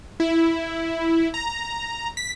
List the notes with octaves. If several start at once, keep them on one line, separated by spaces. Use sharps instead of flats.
E4
A#5
B6